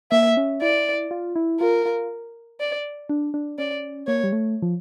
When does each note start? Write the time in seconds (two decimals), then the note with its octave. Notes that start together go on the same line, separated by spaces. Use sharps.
0.12 A#3 E5
0.37 C#4
0.62 E4 D5
1.11 F4
1.36 E4
1.60 F4 A#4
1.85 F4
2.60 D5
3.09 D4
3.34 D4
3.58 C#4 D5
4.07 A#3 C#5
4.24 G3
4.33 A3
4.62 F3